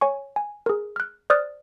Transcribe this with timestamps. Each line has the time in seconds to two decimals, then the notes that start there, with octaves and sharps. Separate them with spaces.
0.01 C#5 G#5 C#6
0.36 G#5
0.66 G#4 A#4
0.96 F6 F#6
1.30 C5 D5 D#6 F6 F#6 A6